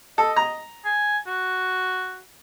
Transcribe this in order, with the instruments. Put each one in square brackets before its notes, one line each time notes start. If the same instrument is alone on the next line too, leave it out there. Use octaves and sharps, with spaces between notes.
[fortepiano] A4 [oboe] D#5
[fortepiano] A#5
[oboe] G#5
F#4